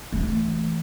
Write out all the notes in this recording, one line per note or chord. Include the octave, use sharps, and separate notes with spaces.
E3 A3